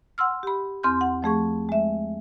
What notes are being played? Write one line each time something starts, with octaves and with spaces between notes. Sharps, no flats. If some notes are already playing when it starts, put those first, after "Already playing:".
F#5 C6 E6 F6
G4 B5
E2 C4 C6 F6 G6
F#5
F3 A3 G#4 C#6
G#3 E5